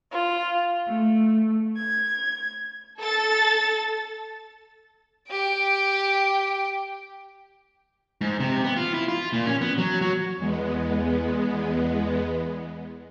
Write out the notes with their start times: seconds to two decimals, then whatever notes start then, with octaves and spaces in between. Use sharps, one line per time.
0.12 F4
0.87 A3
1.77 G#6
2.98 A4 A6
5.30 G4 G5
8.21 G#2
8.40 C3
8.64 B3
8.76 F4
8.94 E4
9.08 F4
9.33 A#2
9.46 C#4
9.61 B3
9.78 F#3
10.01 F#3
10.37 E2 G#3 B3